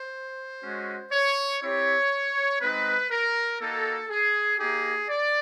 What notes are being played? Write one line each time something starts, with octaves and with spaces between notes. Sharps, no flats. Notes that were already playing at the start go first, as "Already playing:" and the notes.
Already playing: C5
G#3 C#4 F#4
C#5
C4 E4 G4 C#5
G#3 C4 D#4 B4
A#4
A#3 D#4 F#4 A4
G#4
A#3 D#4 G4 G#4
D5